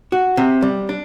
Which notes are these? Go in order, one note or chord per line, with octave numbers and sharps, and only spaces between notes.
F#4
C3
G3
D4